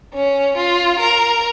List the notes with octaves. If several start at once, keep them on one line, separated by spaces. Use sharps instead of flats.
C#4
F4
A#4